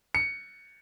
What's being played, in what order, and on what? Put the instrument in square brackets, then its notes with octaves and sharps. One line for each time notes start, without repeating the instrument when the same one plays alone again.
[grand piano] C#7